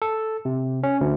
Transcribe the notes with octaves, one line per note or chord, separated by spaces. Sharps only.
A4
C3
C#4
D2